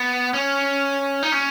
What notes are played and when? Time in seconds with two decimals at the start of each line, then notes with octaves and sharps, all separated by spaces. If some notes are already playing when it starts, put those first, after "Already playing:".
Already playing: B3
0.34 C#4
1.23 D#4
1.32 C#4